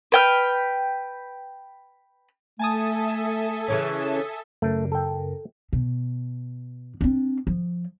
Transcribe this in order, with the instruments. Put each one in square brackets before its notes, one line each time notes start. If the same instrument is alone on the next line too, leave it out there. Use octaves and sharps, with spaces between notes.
[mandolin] B4 G5 F6
[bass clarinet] A3 [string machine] A4 E5 [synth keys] G#5 A5 D#6
[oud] C#3 E3 C#4
[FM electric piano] F#2 C#3 A#4 [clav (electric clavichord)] A3
[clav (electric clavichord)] A4 G5
[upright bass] B2
C4 D4
F3